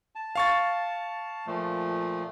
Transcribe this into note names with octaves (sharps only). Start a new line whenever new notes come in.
A5
F5 C#6 A6
A#2 F3 A3